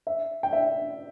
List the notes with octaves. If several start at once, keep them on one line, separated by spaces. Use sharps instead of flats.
E5
G5
E5